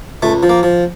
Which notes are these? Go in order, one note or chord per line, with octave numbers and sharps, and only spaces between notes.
C#2 A3
F3
A#3
F3